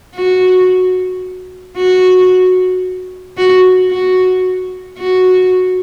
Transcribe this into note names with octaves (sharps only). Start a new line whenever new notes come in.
F#4
F#4
F#4
F#4
F#4